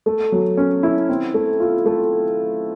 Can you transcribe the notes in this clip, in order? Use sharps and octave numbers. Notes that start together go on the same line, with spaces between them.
A3
F#3
C#4
E4
C4
A3
F4
A3